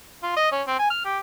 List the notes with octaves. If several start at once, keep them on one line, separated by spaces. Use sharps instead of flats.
F4
D#5
C#4
C4
G#5
F6
G4